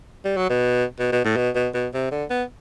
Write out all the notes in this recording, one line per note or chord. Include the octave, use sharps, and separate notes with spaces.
G3
F#3
B2
B2
B2
A2
B2
B2
B2
C3
D3
B3